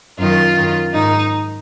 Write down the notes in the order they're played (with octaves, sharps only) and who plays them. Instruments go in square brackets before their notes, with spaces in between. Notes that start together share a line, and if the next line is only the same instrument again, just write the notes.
[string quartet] F#2 D#3 F4
F#2 D#3
G#2 D#3 D#4